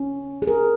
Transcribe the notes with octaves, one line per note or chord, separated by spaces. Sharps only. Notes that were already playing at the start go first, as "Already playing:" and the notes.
Already playing: C#4
G#4
A#4